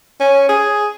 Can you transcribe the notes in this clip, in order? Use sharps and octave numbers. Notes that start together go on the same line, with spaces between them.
C#4
G#4